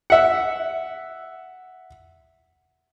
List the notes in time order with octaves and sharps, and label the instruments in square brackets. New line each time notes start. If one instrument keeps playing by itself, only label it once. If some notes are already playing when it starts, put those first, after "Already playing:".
[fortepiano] E5 F#5